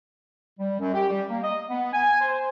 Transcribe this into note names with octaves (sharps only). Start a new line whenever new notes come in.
G3
F#2
G4
G3
A#3
D#5
B3
G#5
C5